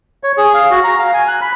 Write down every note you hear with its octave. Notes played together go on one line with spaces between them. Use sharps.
C#5
G#4
F5
F#4
A#5
F5
G#5
F#6
B5